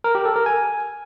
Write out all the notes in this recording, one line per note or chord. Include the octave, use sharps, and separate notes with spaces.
A#4
G4
A4
A#4
G#5